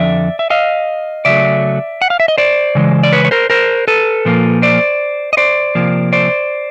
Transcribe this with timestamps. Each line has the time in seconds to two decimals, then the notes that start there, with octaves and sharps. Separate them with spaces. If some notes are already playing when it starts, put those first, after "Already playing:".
Already playing: F2 D3 F3 D5 E5
0.39 E5
0.50 D#5 F5
1.25 C#3 F#3 A3 D5 E5
2.02 F#5
2.10 F5
2.20 E5
2.28 D#5
2.38 C5 D5
2.75 C#3 E3 G#3
3.03 D5
3.13 B4 C#5
3.25 C#5
3.31 A#4 C5
3.50 A#4 C5
3.88 A4 B4
4.25 A#2 F3 A#3
4.62 C5 D5
5.33 D#5
5.37 C5 D5
5.75 C3 F3 A#3
6.13 C5 D5